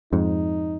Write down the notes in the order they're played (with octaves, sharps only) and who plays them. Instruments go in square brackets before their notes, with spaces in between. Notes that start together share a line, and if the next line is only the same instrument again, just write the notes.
[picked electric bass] F2 G#2 [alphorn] D#4